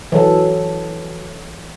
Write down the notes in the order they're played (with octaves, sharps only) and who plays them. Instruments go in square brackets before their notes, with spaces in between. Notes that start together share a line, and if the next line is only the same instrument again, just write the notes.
[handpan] E3 F#3 A4